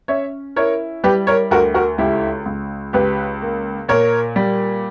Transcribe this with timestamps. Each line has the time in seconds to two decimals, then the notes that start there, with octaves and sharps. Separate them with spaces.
0.08 C#4 C#5 E5
0.56 E4 A#4 C#5
1.04 G3 G4 B4
1.27 A#4 C#5
1.51 D2 F#4 A#4
1.74 F#4 A#4
1.98 C#2 E4 G4
2.46 C#2
2.93 C#2 G4 B4
3.42 A#3
3.88 A#2 A#4 C#5
4.36 G3